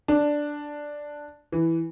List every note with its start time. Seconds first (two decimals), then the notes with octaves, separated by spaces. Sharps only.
0.08 D4
1.52 E3